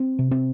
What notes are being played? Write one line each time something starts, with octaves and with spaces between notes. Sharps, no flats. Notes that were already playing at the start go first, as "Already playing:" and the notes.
Already playing: C4
C3
C4